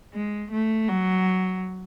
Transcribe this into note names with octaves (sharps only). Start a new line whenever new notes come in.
G#3
A3
F#3